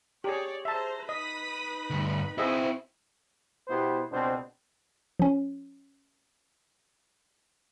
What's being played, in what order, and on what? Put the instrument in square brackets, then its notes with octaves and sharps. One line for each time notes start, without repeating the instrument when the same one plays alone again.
[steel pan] G4 G#4 [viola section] C#5 D5
[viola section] G#4 C5 A#5 [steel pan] E5 A5
[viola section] D#4 B4 B5 [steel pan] D#5 [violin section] D#6 B6
[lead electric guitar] D2 G2
[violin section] C4 C5 [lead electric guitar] E4 F#4 [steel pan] G#4 D#5 E5
[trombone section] B2 B3 E4 G4 C5
C#2 B2 C4 D4 C5
[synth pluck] F3 C#4